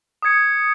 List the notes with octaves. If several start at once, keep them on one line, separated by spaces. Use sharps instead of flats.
D#6 G#6 C#7